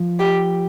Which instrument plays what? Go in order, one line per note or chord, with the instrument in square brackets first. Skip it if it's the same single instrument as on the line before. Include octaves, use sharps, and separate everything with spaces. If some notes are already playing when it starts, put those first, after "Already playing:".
Already playing: [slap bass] F3
[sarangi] G4